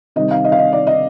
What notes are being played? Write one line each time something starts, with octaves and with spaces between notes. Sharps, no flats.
C3 D#3 G3 D#5
F5
D#5
F5
D#5
D5
D#5